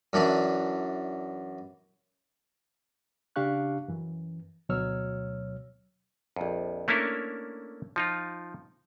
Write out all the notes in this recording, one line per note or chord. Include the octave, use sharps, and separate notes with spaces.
F#2 E3 D4
C#3 D4 G4 F5 C#6 F#6
F#2 E3
D2 B2 F#3 C#5 E6 F6
A#1 F2
A3 A#3 C#4 D4 E4 A#4
F3 D#4 F4